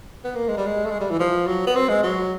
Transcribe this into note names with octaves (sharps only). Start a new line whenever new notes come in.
B3
A#3
G#3
G3
G#3
A3
G#3
G3
E3
F3
F#3
B3
C4
G#3
F#3